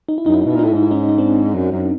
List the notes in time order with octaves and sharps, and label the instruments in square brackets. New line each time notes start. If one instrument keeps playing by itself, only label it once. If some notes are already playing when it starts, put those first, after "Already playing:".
[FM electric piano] D#4
E4
[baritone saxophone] F#2 [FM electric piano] D#4
[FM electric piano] E4
D#4
[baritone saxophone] B2
[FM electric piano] E4
[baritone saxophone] A#2 [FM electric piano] D#4
[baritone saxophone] A2 [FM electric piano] E4
[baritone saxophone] G#2 [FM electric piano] D#4
[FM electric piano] E4
C#4 D#4
D#4
C4 D4
[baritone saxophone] F#2
F#2